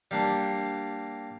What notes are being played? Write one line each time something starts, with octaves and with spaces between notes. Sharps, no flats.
G3 A#3 D4